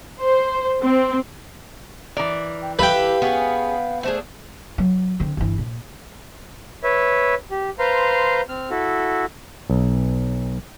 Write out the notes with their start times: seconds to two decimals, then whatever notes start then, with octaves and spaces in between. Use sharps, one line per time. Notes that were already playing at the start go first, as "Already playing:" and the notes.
0.19 C5
0.80 C4
2.17 E3 A#4 D5
2.62 G5
2.79 E4 G4 A4 B4 F5 G5
3.22 B3 C#4 G#4
4.03 A3 D4 G#4 C5
4.78 F#3
5.20 D3 C4
5.37 G1 E3
5.58 A#2
6.83 B4 C#5 E5
7.51 G4
7.79 B4 C5 F5 A#5 C6
8.49 C4 F6
8.70 E4 F#4 A4
9.70 B1